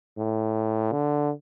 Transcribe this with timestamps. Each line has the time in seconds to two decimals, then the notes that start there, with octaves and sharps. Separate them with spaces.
0.18 A2
0.92 D3